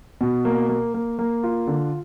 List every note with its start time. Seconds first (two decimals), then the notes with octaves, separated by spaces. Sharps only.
0.21 B2
0.45 A#3
0.69 A#3
0.94 A#3
1.19 A#3
1.44 F4
1.67 D3